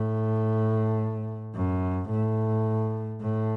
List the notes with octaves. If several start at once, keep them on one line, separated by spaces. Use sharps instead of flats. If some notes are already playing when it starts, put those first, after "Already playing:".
Already playing: A2
F#2
A2
A2